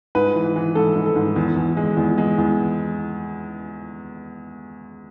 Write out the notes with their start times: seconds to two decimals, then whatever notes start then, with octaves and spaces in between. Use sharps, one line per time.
0.15 G#2 B4
0.36 E3
0.56 E3
0.75 G#2 A4
0.96 G#2
1.06 A4
1.16 G#2
1.36 E2
1.56 E2
1.77 G#3
1.97 E2
2.18 G#3
2.38 E2